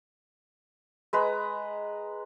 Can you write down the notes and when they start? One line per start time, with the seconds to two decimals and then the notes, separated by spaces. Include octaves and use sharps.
1.13 G#3 B4 A#5